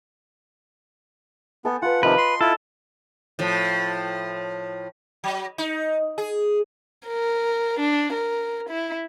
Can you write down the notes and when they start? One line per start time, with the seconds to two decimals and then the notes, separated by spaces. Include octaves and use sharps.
1.65 B3 A4 G5 G#5
1.82 F4 B4 F#5
2.03 C3 D#3 F3 B4 D#5 B5 C6
2.18 F5 C6
2.41 E4 F4 A4
3.39 A2 F3
5.24 F#3
5.58 D#4
6.18 G#4
7.07 A#4
7.80 D4
8.13 A#4
8.70 E4